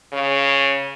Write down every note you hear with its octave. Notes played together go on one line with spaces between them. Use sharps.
C#3